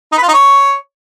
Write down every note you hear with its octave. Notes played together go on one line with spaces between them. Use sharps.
D#4
B4
F4
D#4
C#5